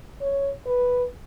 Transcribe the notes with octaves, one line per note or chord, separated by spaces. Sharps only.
C#5
B4